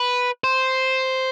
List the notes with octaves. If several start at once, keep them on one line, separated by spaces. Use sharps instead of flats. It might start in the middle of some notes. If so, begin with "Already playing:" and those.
Already playing: B4
C5